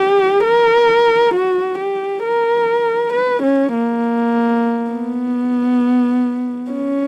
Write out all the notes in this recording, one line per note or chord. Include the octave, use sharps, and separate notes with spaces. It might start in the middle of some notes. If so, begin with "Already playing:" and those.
Already playing: G4
A#4
F#4
G4
A#4
B4
C#4
A#3
B3
C#4